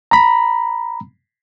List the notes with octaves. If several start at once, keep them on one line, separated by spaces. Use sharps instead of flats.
A#5 B5